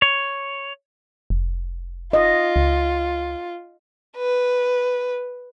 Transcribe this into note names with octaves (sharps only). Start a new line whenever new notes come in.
C#5
F1
F4 D#5
C#2
B4